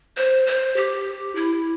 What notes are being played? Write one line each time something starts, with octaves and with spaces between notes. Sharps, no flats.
C5
C5
G4
E4